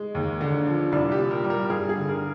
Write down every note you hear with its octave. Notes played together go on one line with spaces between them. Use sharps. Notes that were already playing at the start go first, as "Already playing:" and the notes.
Already playing: G#3
D#2
D3
F3
C2 D5
G4
A#2
A#4
G3
A#4
G2 G#4
G#4
D3
A#4